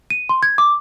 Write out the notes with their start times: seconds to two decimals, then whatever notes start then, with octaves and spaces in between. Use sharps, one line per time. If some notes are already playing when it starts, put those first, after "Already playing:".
0.10 D#7
0.29 C6
0.43 G#6
0.58 D6